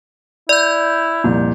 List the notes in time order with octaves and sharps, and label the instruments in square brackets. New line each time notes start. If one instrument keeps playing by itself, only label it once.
[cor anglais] E4 [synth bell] D5 G6
[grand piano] C2 F2 A#2